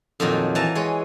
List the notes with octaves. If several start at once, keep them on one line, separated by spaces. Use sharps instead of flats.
F2 A#2 D#3 F3 F#3
E3 A5 A#5
G#3 C#5